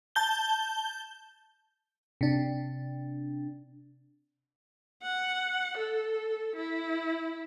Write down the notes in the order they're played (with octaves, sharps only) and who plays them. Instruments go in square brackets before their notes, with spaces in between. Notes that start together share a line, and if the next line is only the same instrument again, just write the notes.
[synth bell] A5 G6 G7
[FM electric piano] C3 D4
[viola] F#5
A4
E4